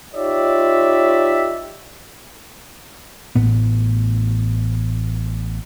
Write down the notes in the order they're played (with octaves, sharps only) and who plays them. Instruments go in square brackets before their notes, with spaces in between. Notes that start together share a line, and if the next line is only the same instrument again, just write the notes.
[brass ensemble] D#4 F4 G4 C#5 D5 E5
[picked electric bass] A1 A2 B3